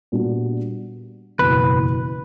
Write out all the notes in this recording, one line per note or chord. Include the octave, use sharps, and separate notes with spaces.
A#2 G3 B3 D4 F#4
F#1 E2 B2 B4